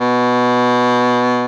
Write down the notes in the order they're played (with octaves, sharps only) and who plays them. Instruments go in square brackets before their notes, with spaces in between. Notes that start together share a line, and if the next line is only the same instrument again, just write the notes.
[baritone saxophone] B2